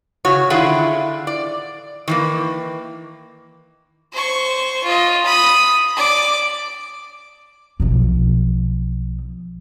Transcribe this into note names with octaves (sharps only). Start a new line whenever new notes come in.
C#3 F#4 C#5
D3 D#3 E4 F4 G#4 F#5
D5
D#3 E3 A#3
C5 C#6
F4 D#5
B5 D#6
D5 D6
B1 F3